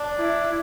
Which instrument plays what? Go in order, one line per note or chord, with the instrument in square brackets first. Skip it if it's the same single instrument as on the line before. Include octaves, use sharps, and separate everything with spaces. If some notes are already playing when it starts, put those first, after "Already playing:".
Already playing: [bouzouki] D4
[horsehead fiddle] E4